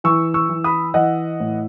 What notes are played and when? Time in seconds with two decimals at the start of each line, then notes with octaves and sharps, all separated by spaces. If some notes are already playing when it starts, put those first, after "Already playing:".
0.04 E3 C#6 E6
0.34 C#6 E6
0.49 E3
0.64 B5 D#6
0.94 E3 D#5 F#5
1.40 A2